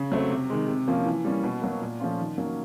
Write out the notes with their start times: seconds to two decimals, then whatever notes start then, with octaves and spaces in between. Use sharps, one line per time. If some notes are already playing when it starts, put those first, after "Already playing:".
Already playing: C#3
0.12 F#3 A3 C4
0.30 C3
0.50 D#3 G#3
0.68 C3
0.88 F3 A#3 C#4 F4
1.06 E3
1.24 G3 A#3 C#4
1.44 B2
1.62 F#3 A#3
1.81 A#2
2.00 F3 A3 C#4 F4
2.18 D#3
2.38 F#3 A#3 C#4